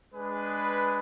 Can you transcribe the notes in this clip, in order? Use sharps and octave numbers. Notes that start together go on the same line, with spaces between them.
G#3 D4 G#4 B4